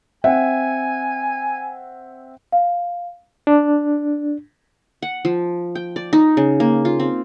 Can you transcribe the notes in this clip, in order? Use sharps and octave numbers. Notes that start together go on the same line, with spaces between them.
C4 E5 F#5 G#5
F5
D4
F#5
F3
G5
D5
D#4
C#3
A#3
F4
C4